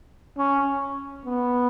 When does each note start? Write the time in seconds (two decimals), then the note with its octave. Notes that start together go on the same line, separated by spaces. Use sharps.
0.38 C#4
1.25 B3